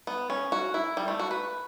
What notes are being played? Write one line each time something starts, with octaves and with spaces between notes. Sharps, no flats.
B3
C#4
F#4
E4
G3
A3
F#4
B4